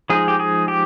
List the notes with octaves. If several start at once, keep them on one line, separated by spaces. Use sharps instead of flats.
F3 G#3 D#4 G#4
G4
G#4
G4